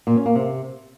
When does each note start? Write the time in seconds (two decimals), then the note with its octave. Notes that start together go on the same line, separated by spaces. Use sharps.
0.07 A#2
0.16 C#4
0.26 A#3
0.35 C3